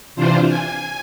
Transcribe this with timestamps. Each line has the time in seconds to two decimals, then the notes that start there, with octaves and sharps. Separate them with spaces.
0.16 C3 E3 D4 F4 C5
0.48 G#5